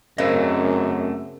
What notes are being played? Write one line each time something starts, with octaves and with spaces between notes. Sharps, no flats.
F#2 C#3 A3 C4 A#4 C5 D#5